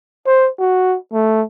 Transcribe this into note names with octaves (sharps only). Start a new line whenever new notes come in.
C5
F#4
A3